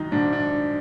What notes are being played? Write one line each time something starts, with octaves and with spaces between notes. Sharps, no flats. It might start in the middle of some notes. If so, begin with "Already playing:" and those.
Already playing: F#2 D#3 D#4
G#2 D4
D4